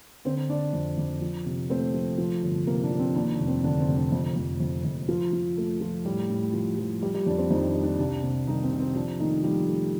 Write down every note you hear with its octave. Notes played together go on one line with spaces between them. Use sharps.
D3 C4 C5
D3 D4 D5
F2
F2
F3
C3
A3 C4 C5
F3
F3
G1
C3 A#3 A#4
D4
F3
C4
D#2 D4
D4
F1
C4
D3 D4
C4
F1
D4
F2
F2
F2
F2
F3 F4
F3
A3
F3
A2 G3 G4
A2
F3
F3
G3 G4
G3 G4
F2 D4 D5
C4 C5
F2 D#3 D#4
D4
G3
D4
C2 D4
C3
C2 D#3 D#4
C4
C3
C4
F3 D4
D#3 A3 D#4
F3 G3 G4
A3